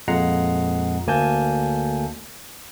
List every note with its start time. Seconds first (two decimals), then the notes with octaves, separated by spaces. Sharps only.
0.08 F2 A#2 G#3 F#5 A#5 C7
1.07 D2 A#3 G#5 A5 G6